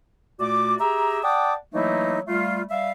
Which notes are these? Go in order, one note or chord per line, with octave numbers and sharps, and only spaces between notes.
A#2 A3 F#4 D5 D6
G4 G#4 E5 A#5
D5 F#5 G5 A5 D6 D#6
E3 F#3 A3 A#3 D#4 E4
G3 A3 F4
G3 E5 F5